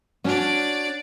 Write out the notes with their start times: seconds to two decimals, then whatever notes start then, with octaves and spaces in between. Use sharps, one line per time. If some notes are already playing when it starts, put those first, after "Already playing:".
0.24 C#4 D4 F#4 D5